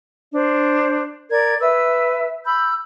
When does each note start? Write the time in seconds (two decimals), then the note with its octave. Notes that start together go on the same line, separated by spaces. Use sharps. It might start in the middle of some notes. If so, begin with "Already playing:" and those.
0.33 D4 C5
1.31 A#4 D5 G#6
1.61 B4 E5 E6
2.45 B5 E6 G6